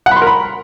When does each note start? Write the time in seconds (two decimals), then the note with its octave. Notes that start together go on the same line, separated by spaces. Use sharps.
0.06 F#5
0.11 B5
0.16 C6
0.22 A#4
0.27 B5